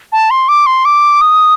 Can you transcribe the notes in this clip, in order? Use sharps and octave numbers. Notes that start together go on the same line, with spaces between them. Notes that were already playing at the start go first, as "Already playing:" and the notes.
A5
C6
D6
C6
D6
D#6